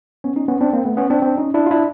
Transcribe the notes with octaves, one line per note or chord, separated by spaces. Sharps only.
B3 C#4
C#4 D#4
B3 C#4
C4 D4
A#3 C4
A3 B3
B3 C#4
C4 D4
C4 D4
C#4 D#4
D4 E4
F4
D4 E4